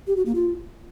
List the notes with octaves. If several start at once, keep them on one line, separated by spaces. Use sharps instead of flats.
G4
F#4
A#3
F4